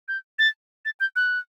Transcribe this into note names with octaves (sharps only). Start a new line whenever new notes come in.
G6
A6
A6
G6
F#6